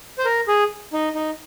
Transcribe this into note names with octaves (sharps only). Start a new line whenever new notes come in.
C5
A#4
G#4
D#4
D#4